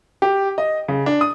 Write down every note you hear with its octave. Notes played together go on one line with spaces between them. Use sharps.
G4
D#5
C#3
D4
D#6